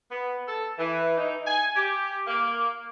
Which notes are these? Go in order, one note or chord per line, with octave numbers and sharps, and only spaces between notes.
B3
A4
E3
D#4
G#5
G4
A#3